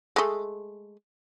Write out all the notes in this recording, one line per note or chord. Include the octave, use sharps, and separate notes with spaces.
G#3 A3